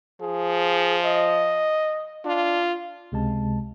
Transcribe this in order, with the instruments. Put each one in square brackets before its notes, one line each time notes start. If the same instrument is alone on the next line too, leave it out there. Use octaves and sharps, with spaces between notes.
[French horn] F3 [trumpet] G#4
[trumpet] D#5
[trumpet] D4 [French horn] F4
[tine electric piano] C#2 C3 G#3 A5